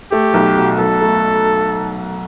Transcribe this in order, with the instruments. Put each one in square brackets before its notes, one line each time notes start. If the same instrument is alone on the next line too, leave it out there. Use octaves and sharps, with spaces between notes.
[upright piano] A3 [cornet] G4
[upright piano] B1
B2
[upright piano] B1 [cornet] A4
[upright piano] A3